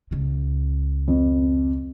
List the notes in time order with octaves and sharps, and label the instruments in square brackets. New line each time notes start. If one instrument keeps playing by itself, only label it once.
[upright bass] C#2 C#3
[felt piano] F2